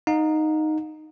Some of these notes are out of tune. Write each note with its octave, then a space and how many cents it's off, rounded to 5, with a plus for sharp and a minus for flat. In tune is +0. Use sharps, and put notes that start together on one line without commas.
D#4 -5 F5 +40